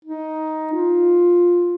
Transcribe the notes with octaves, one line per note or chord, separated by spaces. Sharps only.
D#4
F4